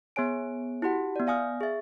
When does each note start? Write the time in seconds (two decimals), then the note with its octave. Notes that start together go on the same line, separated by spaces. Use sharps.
0.16 B3 G#4 C#5 G#5 D7
0.82 E4 F#4 G4 F#5
1.16 B3 D5
1.27 D5 F5 G#5 D#6 F6
1.60 G#4 E5